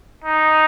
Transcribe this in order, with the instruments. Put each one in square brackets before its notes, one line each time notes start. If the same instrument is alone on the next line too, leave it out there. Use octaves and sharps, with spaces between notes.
[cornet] D#4